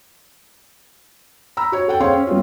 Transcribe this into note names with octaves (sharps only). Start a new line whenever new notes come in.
A#5 B5 E6
F#4 C#5
A4 F#5 G5
C4 G#4 C#5 F5 G5 C6
C#4
F#3 G3 B3 C#4 F4